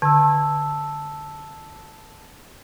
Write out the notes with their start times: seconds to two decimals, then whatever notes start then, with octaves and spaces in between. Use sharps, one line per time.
0.02 D3 A5 E6